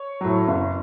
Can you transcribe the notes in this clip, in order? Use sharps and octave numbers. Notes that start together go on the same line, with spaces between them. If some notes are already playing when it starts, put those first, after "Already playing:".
Already playing: C#5
A2 F#3
F#1